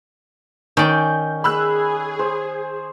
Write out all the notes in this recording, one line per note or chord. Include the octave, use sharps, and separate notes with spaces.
D#3 C#4 D5 G6
G#4 B5 E6 F#6
C5